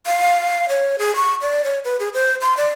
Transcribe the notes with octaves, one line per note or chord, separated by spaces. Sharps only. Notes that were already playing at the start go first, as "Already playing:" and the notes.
F5
C#5
G#4
C#6
D5
C#5
B4
G#4
C5
C6
D5